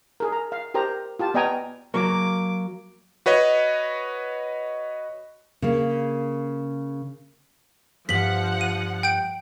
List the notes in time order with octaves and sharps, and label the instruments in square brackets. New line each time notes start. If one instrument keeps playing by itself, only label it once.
[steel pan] G#4 A#4
A#5
F5
G4 A#4 C5 A#5
F4 G4 A5
B3 D5 D#5 G5 G#5 A#5
[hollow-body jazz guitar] F#3 A#3 [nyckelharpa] D6
[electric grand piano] F#4 B4 C#5 D#5
[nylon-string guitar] C#3 A#3
[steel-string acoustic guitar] G2 [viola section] F3 F#5 [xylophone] B6 F#7
[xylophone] D#7
G5 G6 D7